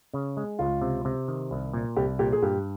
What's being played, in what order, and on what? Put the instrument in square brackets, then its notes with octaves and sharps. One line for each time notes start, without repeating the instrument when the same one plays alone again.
[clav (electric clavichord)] C#3
G#3
[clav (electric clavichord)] C#2 [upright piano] F4
[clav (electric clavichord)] C3
C3
D#3
C2
A#2
[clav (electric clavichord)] C2 [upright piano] G4
[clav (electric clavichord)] A#2 [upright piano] G4
[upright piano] G#4
[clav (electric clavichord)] G2 [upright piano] G4